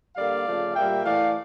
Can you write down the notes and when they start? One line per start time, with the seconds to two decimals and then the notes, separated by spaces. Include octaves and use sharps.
0.16 D3 G3 A#3 D5 F5
0.46 C#3 F3 A3
0.75 A#2 G3 A#3 E5 G5
1.04 A2 E3 A3 D5 F5